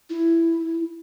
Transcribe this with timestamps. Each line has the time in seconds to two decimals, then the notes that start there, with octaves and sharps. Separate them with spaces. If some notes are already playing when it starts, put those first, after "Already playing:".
0.10 E4